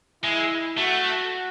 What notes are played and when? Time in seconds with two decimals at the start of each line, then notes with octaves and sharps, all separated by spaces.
0.24 G#3 E4
0.77 A3 F#4